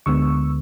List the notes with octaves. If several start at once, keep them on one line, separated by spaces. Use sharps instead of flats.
D2 D3 G#3 B3 C#6 E6